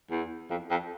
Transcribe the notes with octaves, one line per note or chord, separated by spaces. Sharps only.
E2
F2
F2